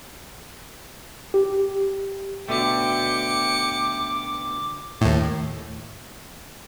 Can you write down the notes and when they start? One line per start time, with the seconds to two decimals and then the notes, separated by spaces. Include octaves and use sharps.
1.34 G4
2.49 B2 D3 A3 G5 D6 C#7 D7
5.01 D#2 A2